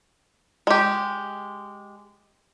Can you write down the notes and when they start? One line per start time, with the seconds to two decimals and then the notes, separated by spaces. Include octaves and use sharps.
0.67 G#3 G4